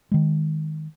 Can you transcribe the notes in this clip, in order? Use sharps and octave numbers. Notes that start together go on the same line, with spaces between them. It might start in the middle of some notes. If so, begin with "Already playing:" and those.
D#3 G#3